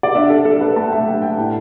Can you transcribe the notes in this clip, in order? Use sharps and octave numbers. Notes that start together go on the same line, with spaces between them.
D5
D4 E5
A4
D4 A4
A4
B4
A3 A5
G5
E5
A3 G5
G5
A2 A5